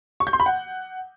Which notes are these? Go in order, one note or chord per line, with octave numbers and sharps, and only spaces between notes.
C#6
G6
C6
B5
F#5